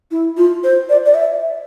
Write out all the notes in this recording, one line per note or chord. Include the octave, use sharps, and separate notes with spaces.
E4
F4
C5
D5
D5
E5